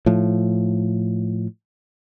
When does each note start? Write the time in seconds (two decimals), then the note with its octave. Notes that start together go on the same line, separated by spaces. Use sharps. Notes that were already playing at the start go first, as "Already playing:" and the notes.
0.06 A2 F3